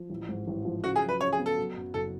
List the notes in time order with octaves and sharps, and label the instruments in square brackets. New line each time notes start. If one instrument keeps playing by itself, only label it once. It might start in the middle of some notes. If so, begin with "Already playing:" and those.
Already playing: [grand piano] F3
A1
G#2
A1
F3
[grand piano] C#3 [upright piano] F#4
[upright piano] G#4
[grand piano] F#3
[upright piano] B4
[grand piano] C#3 [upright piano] C#5
[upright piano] G#4
[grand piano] B3
[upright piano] A4
[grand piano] F#3
F#2
[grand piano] F#1 [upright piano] A4